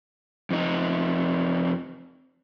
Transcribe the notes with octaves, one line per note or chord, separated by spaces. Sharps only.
F2 D#4